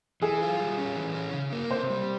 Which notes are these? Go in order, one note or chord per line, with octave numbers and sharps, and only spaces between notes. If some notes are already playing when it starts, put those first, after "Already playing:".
E3 G#4
F4
G3
C#4
E3
C#4
C#3
A#3
C3 C5
G3